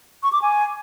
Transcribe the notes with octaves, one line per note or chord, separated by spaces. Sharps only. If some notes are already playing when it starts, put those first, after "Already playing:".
C#6
D6
G#5